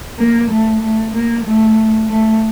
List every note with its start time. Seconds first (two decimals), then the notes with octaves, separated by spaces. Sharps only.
0.19 A#3
0.51 A3
0.82 A3
1.14 A#3
1.45 A3
2.10 A3